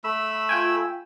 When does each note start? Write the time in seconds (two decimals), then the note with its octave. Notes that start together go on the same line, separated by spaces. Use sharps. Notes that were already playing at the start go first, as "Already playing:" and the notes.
0.04 A3 B5 E6
0.49 F4 G5 G#5